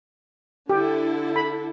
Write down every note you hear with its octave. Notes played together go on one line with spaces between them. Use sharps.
D3 E4 G4 A4
B5